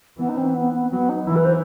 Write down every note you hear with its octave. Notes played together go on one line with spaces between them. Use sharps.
E3 B3
D#4
C4
B3
B3
F#3 B3
D#4
E3 E4
B4
C5